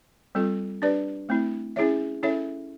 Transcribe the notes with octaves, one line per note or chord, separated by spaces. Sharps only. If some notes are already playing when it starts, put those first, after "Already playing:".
G3 C4 F4 A4
D4 G4 B4 D5
A3 C4 E4
C#4 E4 G#4 C#5 E5
C#4 E4 A4 C#5 E5